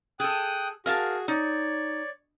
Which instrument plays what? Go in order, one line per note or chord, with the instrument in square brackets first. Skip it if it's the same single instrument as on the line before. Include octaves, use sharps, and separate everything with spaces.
[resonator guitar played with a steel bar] G#4 A4 [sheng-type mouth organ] G5 D#6 F#6
[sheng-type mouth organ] F#4 G#4 [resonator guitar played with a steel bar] A#4 F5 A5
[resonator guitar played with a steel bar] D#4 [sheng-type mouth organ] C#5 D5